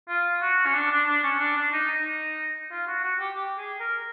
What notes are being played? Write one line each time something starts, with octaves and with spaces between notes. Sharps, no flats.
F4
F#4
C#4
D4
D4
D4
C#4
D4
D4
D#4
D#4
F4
F#4
F#4
G4
G4
G#4
A#4